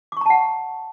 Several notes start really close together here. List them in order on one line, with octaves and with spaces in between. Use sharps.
D6 C#6 A#5 A5 F#5